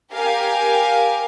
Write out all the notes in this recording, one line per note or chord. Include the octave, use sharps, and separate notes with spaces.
G4 A#4 F5 G#5